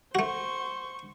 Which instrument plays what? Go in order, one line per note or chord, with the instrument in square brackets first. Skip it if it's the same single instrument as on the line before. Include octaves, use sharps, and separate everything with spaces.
[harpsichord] A3 F#4 [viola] C5 C#6